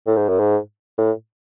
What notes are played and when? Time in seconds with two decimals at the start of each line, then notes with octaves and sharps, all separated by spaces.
0.07 A2
0.17 G#2
0.29 F#2
0.40 G#2
0.98 A2